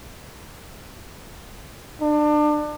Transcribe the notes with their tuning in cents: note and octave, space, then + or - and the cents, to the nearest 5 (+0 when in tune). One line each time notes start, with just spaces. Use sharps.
D4 +30